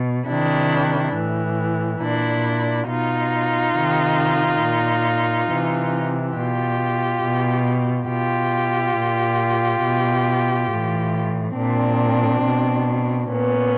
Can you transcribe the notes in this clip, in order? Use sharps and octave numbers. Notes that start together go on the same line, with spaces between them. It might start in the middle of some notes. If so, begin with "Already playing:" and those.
Already playing: B2
C3 D#3 D4 E4
A2 E3
A#2 D4 E4
B2 D#4 F4
C3 D#3
A#2
C3 E3
B2 F4 G4
B2
B2 F4 G4
A#2
B2
A2 E3
A#2 C4 D4
B2
A#2 B3 C#4